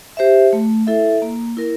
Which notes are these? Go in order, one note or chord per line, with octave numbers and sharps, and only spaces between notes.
G4 C5 E5
A3
E4 A4 E5
A#3
E4 A#4